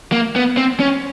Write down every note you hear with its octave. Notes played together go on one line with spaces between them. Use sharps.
A#3
B3
C4
C#4